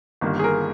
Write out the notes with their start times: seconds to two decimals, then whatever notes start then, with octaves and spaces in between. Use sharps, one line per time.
0.21 G1 G2 D#3 A#3
0.39 G#4
0.44 A#4